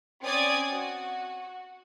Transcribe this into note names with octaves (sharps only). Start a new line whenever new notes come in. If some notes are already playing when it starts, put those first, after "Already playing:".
C4 C#4 D5 G#5 D#6 G#6
F#4